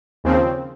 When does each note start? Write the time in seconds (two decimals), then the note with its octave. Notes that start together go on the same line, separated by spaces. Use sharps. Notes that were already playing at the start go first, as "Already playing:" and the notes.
0.24 D#2 C#3 F3 C4